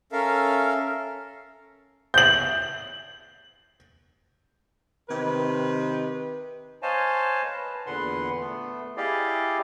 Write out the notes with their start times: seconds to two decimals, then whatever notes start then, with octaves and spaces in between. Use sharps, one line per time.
0.12 C#4 A4 A#4 E5 F5
2.14 G6 F#7
5.09 C3 D#3 B4
6.82 C5 C#5 D#5 F5 G#5 A5
7.45 B4
7.86 E2 A#2 D3 B4 F#5 C6
8.40 A3 B3
8.97 E4 G4 G#4 D5 D#5 F5